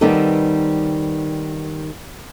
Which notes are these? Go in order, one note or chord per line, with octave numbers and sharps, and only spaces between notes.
D#3 G3 B3 C4 D#4 A4